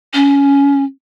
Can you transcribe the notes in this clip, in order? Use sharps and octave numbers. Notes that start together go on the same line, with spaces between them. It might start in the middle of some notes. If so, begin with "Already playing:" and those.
C#4